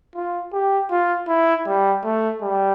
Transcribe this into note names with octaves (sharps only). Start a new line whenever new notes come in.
F4
G4
F4
E4
G3
A3
G3